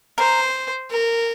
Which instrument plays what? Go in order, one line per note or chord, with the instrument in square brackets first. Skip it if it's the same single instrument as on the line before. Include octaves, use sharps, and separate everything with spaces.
[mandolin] A#4 [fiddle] C5
[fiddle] A#4